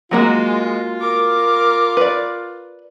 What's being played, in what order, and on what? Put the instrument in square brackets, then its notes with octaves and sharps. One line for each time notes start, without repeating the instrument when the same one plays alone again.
[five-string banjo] F#3 A#3 F#4 [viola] G#3 [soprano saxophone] F4
[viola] A#4 D6
[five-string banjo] B4 D5